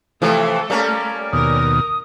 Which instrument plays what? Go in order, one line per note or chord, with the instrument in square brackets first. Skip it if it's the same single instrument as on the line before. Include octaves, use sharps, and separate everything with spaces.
[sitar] C3 E3 F3 [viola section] A3 A4
[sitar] G3 A#3 C#4 [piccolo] A#5
[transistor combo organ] D#2 B2 [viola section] A#4 [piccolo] D#6